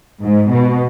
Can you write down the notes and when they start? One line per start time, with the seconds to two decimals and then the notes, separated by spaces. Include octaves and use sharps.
0.23 G#2
0.52 B2